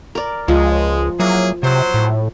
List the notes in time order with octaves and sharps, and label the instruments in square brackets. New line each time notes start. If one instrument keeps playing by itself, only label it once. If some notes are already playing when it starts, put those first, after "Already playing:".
[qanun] A#4 D5
[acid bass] C#2 [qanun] F3 [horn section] G#3
[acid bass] F#3 [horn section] A#3 E4 G#4
[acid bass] C3 [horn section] F#3 C5
[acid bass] A2